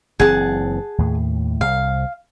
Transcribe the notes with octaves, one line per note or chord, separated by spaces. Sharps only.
F#1 E3 C4 G#4 F#5 A5
D#2 A2
C2 F5